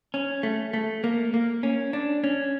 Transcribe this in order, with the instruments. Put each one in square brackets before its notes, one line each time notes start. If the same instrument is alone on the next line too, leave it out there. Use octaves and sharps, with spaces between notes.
[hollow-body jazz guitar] C#4
A3
A3
A#3
A#3
C#4
D4
C#4